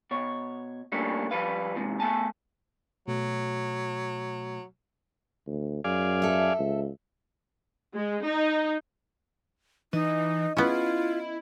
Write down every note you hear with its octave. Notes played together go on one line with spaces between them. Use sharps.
B2 C#5
G3 A3 A#3 C#4 D4 A4
F3 G3 B4 F5
E2 G#2 C3
A3 B3 G#5 A5
B2 F#3 A3
D2
F#2 G#4 D5 F5
A4 E5
C#2
G#3
D#4
E3 D#4 D#5
B3 C#4 E4 F4